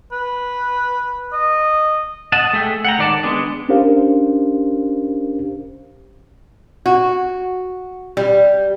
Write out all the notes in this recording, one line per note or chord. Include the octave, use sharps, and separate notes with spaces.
B4
D#5
D#5 F#5 A5
A3 G#4 E5 G5
F#5 G5 A#5
D#3 G#3 D5 F#5 A5
G#3 B3 D4 G#4
C#4 D4 G4 A#4 C5 F5
F#4
G3